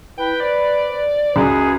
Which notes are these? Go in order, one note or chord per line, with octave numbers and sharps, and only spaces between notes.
E4 B4 G5
C5 D5
C#2 F#2 F#4 G#4